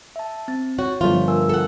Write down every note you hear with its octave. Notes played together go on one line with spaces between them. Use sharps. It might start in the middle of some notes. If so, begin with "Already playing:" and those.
E5 A5
C4 A6
F#4 C#5
G1 F3 A3 F4
A#4 G#5 E6
A4 F#5